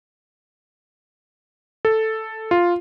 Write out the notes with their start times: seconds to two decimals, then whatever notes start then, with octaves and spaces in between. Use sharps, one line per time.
1.85 A4
2.51 F4